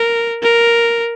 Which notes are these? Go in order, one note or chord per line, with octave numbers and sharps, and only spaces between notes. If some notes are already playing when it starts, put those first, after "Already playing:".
Already playing: A#4
A#4